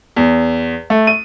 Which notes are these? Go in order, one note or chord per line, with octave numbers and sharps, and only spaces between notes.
E2
A3
D#7